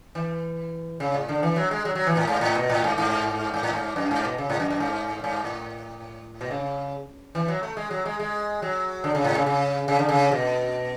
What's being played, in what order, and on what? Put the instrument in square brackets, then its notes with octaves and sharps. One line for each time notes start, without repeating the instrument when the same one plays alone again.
[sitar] E3
C#3
A2
D3
E3
F#3
G#3
F#3
F#3
E3
A2
G#2
A2
B2
A2
G#2
G#2
G#2
A2
G#2
F#2
G#2
B2
C#3
A2
F#2
F#2
G#2
G#2
A2
B2
C#3
E3
F#3
A3
G#3
F#3
G#3
G#3
F#3
D3
C#3
A2
C#3
C#3
C#3
D3
C#3
B2